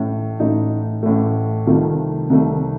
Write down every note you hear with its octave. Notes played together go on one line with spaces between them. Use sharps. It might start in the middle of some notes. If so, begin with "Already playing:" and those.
Already playing: A1 A2 A3
A1 A2 A3 D#4
A1 A2 A3
C2 C3 D#3 A3 F4
C2 C3 D#3 A3